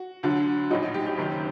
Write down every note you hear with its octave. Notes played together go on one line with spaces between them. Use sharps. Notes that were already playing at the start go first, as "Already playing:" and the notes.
Already playing: F#4
D2 D3 F#3
A#1 A2 F#3 D#4
D#4
G4
G4
F#1 F#2 D#3